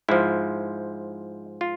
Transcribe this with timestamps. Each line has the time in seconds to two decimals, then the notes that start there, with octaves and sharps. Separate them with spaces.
0.09 G#2 F3 E4
1.61 F4